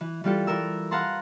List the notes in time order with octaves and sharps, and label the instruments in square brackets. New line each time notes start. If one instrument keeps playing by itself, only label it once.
[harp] E3
E3 G3 F4 G4 A4
E3 A4 A#4 E6
B4 F5 F#5 A5 A#5 C6